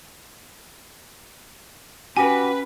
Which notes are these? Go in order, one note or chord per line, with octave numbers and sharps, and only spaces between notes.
C#4 F#4 G4 B4 G#5